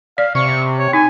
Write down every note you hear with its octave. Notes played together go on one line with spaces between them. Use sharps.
D5 F5
C3 C#6
C#5
D#4 G#5